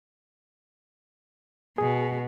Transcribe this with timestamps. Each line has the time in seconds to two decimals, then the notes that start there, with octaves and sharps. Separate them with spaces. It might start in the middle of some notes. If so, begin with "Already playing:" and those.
1.78 B2 G#4